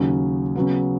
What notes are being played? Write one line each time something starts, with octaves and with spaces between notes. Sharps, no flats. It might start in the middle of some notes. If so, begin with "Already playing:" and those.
Already playing: D#2 C#3 F#3
C#3 F#3 B3